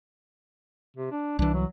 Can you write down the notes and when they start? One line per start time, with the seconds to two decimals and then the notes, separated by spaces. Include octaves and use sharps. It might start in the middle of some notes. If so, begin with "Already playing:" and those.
0.97 C3
1.12 D4
1.39 C2 E3 D4
1.54 F#3